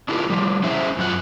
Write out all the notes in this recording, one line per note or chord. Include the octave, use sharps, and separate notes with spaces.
D4 E4 F4 G4 A#4
F3 G3
C#4 E4 C5 C#5 E5
F#2 F3 D4 F#5